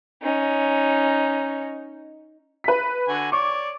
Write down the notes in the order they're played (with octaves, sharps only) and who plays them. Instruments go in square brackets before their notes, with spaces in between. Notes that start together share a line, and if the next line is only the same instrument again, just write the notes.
[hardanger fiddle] C#4 D#4
[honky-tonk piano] B4 B6
[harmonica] D3 F#4 G#5
[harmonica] C#5 D5 C#6 [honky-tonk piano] D6